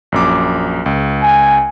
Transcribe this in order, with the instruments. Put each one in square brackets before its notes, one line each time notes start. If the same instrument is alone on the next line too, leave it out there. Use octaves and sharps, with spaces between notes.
[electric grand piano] A#1 F#2 D6
C#2
[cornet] G#5